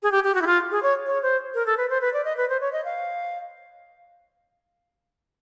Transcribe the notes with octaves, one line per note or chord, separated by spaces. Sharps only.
G#4
G4
G4
F#4
E4
F4
G#4
C#5
C#5
C5
A#4
A4
B4
C5
B4
D5
D#5
B4
C5
C#5
D#5
F5